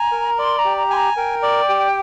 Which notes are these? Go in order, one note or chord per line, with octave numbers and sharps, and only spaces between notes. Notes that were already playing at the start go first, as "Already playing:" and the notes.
Already playing: G#5 A#5
A#4
D5 C6
A#5
G4
A#5
G#5 C6
A#5
A#4 G5
D5
G4